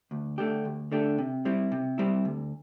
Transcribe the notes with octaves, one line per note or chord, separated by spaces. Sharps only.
D2
D3 A3 D4 G4
D2
D3 A3 D4 G4
C3
G3 C4 E4
C3
G3 C4 E4
D2